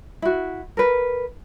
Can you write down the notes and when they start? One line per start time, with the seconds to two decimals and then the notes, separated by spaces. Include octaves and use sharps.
0.22 E4 F#4
0.77 A#4 B4